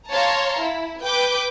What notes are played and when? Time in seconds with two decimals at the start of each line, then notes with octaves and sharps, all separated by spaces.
0.11 C#5 F5 A5 A#5 C6
0.61 E4
1.04 B4 G5 D6 G6